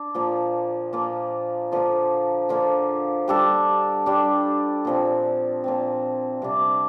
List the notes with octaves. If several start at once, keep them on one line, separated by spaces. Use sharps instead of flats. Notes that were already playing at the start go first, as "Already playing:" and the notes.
Already playing: D4
A#2 F3 A#3 F4
A#2 F3 A#3 F4
D3 F3 A#3 F4
D3 F3 A#3 F4
G3 D4 A4
G3 D4 A4
A#2 F3 C4
A#2 F3 C4
C3 G3 D4